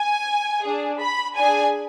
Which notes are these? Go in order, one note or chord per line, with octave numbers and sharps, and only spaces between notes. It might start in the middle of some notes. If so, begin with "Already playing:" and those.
Already playing: G#5
D4 G#4
B5
D4 G#4 G#5